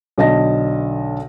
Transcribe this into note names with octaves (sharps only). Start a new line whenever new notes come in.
B1 D3 D#5 A5 A#6